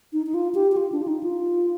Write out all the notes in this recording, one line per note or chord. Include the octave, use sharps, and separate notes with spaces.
D#4
D#4
F4
G4
G4
F4
D4
F4
D#4
F4